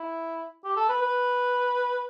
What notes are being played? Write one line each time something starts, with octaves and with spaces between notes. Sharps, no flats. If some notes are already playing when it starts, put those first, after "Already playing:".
Already playing: E4
G4
A4
B4
B4